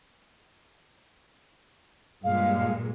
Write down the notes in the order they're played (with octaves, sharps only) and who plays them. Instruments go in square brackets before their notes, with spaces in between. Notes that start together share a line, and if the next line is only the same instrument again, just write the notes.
[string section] G2 A#2 G#3 [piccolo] F5